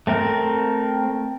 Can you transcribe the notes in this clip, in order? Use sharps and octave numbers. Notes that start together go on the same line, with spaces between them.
A3 C4 A#4